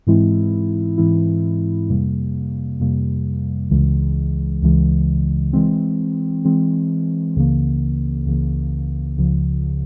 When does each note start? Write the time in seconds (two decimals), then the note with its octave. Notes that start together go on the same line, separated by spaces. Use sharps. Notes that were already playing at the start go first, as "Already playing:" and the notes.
0.07 G#2 E3 G#3 C4 E4
0.98 G#2 E3 G#3 C4 E4
1.90 F2 C3 G3 A#3
2.80 F2 C3 G3 A#3
3.71 C#2 C#3 E3 G#3
4.62 C#2 C#3 E3 G#3
5.53 E3 G#3 C4
6.45 E3 G#3 C4
7.36 C#2 C#3 E3 A#3
8.26 C#2 C#3 E3 A#3
9.18 C#2 C#3 F3